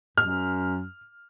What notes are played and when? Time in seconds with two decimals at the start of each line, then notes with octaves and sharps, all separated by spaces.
0.18 F#2 F6